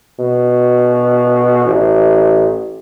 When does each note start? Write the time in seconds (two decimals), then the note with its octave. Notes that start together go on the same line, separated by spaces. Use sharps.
0.19 B2
1.65 A1